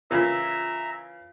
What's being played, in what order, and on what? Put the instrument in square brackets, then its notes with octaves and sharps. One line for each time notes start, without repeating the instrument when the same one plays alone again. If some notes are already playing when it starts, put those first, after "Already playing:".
[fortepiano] C#3 E3 [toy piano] F4 A#4 [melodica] E5 A#5 E6